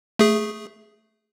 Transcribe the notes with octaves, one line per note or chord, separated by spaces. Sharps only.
A3 G#4